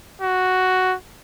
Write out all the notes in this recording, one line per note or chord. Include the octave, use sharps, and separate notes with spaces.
F#4